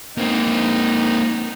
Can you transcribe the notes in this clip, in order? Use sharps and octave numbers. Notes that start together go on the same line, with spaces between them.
A#3 C4 D#4